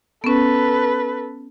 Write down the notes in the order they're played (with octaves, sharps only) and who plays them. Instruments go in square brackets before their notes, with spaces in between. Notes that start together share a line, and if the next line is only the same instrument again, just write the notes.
[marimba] B3 C#4 [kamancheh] A4 B4